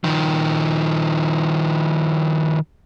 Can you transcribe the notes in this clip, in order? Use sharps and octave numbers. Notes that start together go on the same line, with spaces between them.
D#3 F3